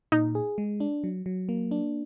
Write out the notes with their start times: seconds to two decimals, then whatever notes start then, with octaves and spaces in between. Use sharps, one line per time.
0.12 A#2 D#4
0.35 G#4
0.58 G#3
0.80 D4
1.04 F#3
1.26 F#3
1.49 A#3
1.71 D4